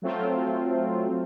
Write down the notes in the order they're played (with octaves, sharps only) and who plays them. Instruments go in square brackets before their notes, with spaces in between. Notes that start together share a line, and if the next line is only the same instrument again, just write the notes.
[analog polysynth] F#3 A3 C4 F4